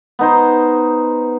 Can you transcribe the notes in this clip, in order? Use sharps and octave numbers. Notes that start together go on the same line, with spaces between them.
B3 D#4 C5